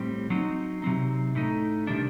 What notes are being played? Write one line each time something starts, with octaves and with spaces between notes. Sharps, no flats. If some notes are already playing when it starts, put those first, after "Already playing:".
Already playing: A2 G3 C4
F#3 C4 D#4
C3 F#3 C4 D#4
A2 A3 D#4
C3 D#3 G3 D4